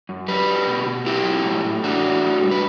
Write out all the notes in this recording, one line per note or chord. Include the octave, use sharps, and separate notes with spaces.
F#2
F#3 G4 B4
F#3
B2
B2
F#3 E4 G4
F#3
A2
A2
E3 D4 F#4
A2
A2
G3
B4